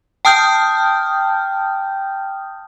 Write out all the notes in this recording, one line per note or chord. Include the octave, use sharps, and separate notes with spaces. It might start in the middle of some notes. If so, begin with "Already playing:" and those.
G5 A5 D#6 F6 G6